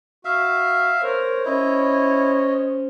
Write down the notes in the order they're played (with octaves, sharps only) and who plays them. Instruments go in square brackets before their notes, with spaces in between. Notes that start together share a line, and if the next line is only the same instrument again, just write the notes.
[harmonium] F#4 [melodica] E5 F5
[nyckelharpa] A#4 [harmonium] C5 C#5
[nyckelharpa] C#4 C5 [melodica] E4 [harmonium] C#5 D#5